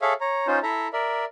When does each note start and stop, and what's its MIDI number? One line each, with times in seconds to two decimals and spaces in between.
0.02 0.13 68
0.02 0.13 69
0.02 0.13 73
0.02 0.13 76
0.02 0.13 77
0.21 0.47 73
0.21 0.47 82
0.47 0.59 61
0.47 0.59 63
0.47 0.59 65
0.47 0.59 72
0.63 0.88 64
0.63 0.88 69
0.63 0.88 76
0.63 0.88 82
0.93 1.25 70
0.93 1.25 74
0.93 1.25 76